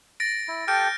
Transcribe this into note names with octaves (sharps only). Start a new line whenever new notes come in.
A6 A#6 D7
E4
G4 A4 G5 F6 G6 D7